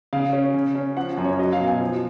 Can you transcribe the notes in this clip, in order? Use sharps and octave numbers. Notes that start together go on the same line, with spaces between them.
C#3 F5
C#4
C#3
C#4
F3 F#5
F#2
C#5
F#3 D#5
F5
B2
G#5
F3